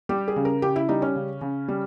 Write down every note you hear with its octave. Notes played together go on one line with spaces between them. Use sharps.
G3 G4
G#4
C#3
A#4
C#3 G4
E4
G3 D#4
C#4
C#3
C#3
G3